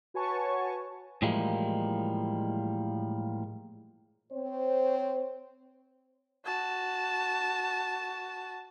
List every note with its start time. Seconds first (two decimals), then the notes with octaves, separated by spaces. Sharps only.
0.14 F#4 B4 C#5 G#5 A5 C#6
1.22 A2 E3 F3 G3 G#3 A#3
4.32 C4 C5 C#5
6.45 F#4 A5